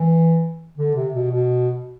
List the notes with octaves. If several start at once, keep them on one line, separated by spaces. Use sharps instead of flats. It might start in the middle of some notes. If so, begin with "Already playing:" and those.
Already playing: E3
D3
C3
B2
B2